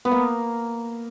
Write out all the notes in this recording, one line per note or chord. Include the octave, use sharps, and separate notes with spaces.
B3
A#3